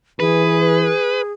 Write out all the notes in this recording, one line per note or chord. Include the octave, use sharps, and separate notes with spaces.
E3 G#4 B4